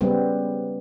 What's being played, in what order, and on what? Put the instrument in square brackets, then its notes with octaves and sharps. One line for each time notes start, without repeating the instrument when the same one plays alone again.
[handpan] C#3 G3 B3 C4